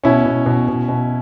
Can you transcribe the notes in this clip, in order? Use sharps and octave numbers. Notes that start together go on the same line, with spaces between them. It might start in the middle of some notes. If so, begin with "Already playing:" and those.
B2 C#4 E4
B2
B2
B2
B2